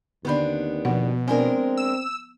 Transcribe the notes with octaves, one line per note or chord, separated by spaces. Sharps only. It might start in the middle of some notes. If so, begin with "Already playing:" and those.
D#2 D3 B3 C4 D4 B5
B2 F3 F#5
G#3 B3 C4 D4 A#4 G#5
E6